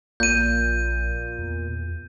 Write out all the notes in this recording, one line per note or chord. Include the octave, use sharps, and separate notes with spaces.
A#1 A#2 G6 D#7
E2